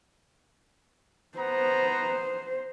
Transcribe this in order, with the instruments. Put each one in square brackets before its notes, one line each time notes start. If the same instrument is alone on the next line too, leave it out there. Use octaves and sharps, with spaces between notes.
[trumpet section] B3 A#5 [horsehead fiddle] C5